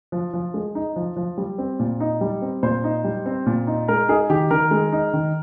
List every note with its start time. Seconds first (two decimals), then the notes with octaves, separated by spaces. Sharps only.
0.12 F3
0.34 F3
0.54 G#3
0.75 D#4
0.96 F3
1.17 F3
1.38 G3
1.58 C4
1.80 A#2
2.00 D#4
2.21 G3
2.42 C4
2.63 A#2 C5
2.84 D#4
3.04 G3
3.26 C4
3.46 A#2
3.67 D#4
3.88 G#3 A#4
4.09 D#4 G#4
4.30 D#3 G4
4.51 D#3 A#4
4.71 G#3
4.92 D#4
5.13 D#3